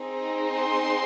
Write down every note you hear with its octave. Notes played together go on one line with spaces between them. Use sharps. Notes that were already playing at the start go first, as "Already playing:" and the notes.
Already playing: C4 D#4 G#4
C6